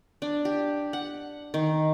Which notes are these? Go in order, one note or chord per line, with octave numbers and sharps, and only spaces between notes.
D4
G4
F#5
D#3